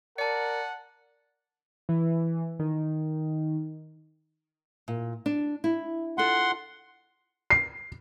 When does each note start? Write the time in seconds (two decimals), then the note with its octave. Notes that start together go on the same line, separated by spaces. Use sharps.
0.18 A#4 D5 F#5 A5 C#7
1.89 E3
2.59 D#3
4.88 A#2
5.26 D4
5.64 E4
6.18 F4 A4 F#5 C6
7.50 C7